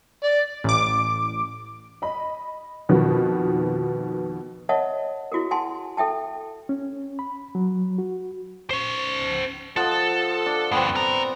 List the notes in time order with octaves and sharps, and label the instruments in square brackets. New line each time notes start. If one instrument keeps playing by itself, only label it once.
[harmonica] D5
[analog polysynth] A1 D6
[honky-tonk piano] D#5 B5
F2 B2 D#3 F3 B3
[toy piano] A#4 C#5 D#5 E5 F#5 A5
E4 F#4 G#4 A#4
F#5 G#5 A5 C6
A4 E5 G5 A5
[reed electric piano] C#4
B5
F#3
F#4
[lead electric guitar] C#4 C5
[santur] F3 D#5 F#5 [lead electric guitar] A4
[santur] D4
[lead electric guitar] D2 G2 [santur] B3 C4
[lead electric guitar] F4 A#5